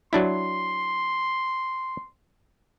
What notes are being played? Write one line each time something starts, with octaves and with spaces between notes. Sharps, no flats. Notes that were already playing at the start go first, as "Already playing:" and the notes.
F#3 D4 E4 C6